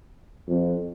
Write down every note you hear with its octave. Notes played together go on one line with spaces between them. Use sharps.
F2